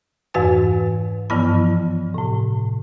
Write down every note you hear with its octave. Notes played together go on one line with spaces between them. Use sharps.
F2 G#2 E3 F#4 B4 G#5
G2 E3 F3 B3 E4 B5
A2 C3